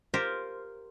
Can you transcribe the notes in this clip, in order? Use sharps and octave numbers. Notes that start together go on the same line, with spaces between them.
F4 G4 A#4 C5